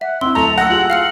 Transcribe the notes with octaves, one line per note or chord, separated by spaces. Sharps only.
E5 F#5
C4 E4 C6 E6
D1 A4 A#5 C#6 F7
F#5 E6 A#6
F4 G4 G#4 F#7
F5 F6 C#7